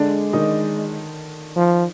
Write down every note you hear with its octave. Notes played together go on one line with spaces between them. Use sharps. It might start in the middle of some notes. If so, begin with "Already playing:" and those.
Already playing: D3 G#3 D4
D#3 D#4
F3